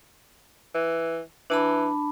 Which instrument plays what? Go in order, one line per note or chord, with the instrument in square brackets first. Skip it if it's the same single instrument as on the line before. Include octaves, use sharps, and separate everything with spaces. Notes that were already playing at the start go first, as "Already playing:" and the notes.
[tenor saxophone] E3
[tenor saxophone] E3 [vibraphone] D4 A5 B5